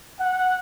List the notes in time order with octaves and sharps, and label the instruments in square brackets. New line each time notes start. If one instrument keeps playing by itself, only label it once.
[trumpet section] F#5